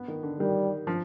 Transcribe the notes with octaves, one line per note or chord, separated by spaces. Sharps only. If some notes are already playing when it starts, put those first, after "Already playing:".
Already playing: B3
D#3
D3
D#3 G3
F3